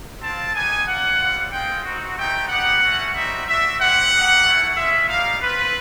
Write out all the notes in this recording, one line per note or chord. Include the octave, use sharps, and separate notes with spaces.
C4 F4 A5
B3 D#4 G4 G#5
A#3 D4 F4 F#5
G3 C4 F4
G#3 C4 F4 G5
C4 D#4 F#4
A3 C4 D#4 G4 G5
B3 D#4 G4 F#5
A3 C#4 F#4
G3 C4 D#4 F#4 E5
A3 D4 F#4 E5
C4 E4 G4 F#5
A#3 D#4 G4
A3 C#4 E4
G#3 C#4 F4 E5
G3 A#3 D#4 F5
C4 F4 B4